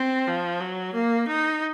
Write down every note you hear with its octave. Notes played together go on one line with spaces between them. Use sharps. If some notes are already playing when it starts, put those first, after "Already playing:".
Already playing: C4
F3
F#3
A#3
D#4